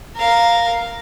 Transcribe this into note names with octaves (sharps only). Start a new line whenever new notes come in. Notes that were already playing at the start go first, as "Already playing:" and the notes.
A#4 F5